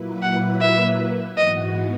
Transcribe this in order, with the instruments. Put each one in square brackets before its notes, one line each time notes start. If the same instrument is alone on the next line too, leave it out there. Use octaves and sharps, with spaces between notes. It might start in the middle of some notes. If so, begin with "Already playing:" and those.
Already playing: [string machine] A#2 F#3 A#3 E4 B4
[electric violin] F#5
E5
[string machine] G#2 E3 B3 F#4 [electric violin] D#5